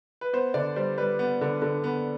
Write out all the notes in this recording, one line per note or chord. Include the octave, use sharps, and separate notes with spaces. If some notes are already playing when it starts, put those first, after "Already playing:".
B4
B3 C5
D3 D5
G3 C5
G3 B4
B3
D3
D3
B3